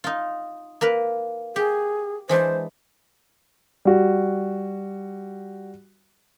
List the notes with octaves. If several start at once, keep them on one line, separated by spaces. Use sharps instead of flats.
D#4 F4
A#3 A#4 B4
G4 G#4
E3 G#3 D4 C5
G3 F#4